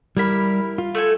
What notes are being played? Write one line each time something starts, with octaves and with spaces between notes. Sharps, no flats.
G3 E4 A#4 B5
F4
A3 A4 G#5